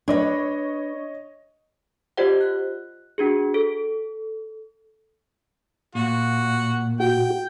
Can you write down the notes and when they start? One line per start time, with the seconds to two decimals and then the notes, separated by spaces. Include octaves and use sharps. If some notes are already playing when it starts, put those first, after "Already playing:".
0.08 D4 B4 C#5 D#5
2.17 F4 G4 C5 D5 D#5 F#5
2.41 F#6
3.18 D4 F#4 G#4
3.54 A4
5.95 A#2 F#4
7.00 F#4 G5